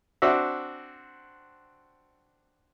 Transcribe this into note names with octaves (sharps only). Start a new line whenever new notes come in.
C4 D4 F#4 D5 E5